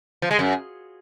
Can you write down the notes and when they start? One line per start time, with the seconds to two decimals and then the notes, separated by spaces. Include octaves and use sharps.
0.22 F3
0.31 G#3
0.39 F#2